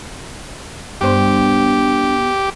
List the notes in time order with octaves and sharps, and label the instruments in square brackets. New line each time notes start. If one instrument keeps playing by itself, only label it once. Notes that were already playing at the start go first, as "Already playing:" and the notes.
[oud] G2 C5 [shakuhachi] B3 [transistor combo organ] G4